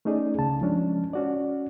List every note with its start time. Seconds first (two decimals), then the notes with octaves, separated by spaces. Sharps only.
0.05 A3 C#4 D#4 G#4 D5
0.38 C#2 C#3 A5
0.61 F3 G#3 C#4 D4
1.13 C#4 F#4 D5